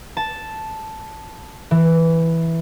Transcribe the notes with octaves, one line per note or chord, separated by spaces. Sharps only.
A5
E3